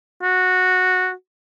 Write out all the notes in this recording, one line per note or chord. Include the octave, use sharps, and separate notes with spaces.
F#4